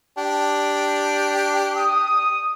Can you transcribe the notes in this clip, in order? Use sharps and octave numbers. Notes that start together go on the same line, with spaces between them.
D4 G4
D#6